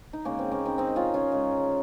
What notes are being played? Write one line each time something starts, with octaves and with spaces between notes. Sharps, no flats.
D#4
C#3 G#3 A#3 C#4
C4
A#3 C#4
C4 D#4
C4 D#4
C#4 F4
C#4 F4
C#3 G#3